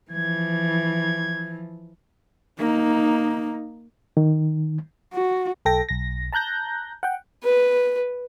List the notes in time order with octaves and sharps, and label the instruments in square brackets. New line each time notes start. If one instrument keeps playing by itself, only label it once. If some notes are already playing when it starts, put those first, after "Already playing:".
[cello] E3 F3 [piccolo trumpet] G#6
[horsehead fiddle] A#3 D#4
[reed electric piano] D#3
[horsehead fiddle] F#4
[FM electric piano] B1 A4 G5 A#6
B1 A#6
A5 A#5 F#6 G6 A#6
F#5 G5
[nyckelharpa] B4